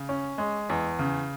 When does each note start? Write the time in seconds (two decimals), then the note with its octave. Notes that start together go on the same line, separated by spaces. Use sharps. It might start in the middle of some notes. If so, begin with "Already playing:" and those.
Already playing: C#3
0.09 C#4
0.38 G#3
0.70 E2
0.99 C#3